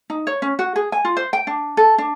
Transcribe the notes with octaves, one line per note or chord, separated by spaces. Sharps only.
D#4
C#5
C#4
F#4
G#4
G#5
F4
C5
G5
D4
A4
D4